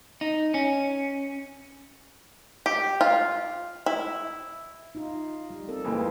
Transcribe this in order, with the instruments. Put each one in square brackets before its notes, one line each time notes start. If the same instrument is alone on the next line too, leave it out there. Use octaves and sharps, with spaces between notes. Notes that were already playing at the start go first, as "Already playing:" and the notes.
[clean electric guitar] D#4
C#4
[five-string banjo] G4
F4
E4
[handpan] D#4 F4
G3
C4 A4 A#4
[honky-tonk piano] F2 E3 G#3 [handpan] A#3 F4